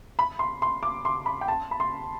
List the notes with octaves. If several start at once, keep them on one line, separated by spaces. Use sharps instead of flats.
B5
C6
C6
D6
C6
B5
G5
A5
B5
C6